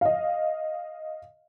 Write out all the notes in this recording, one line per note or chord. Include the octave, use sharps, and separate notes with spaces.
D#5 F5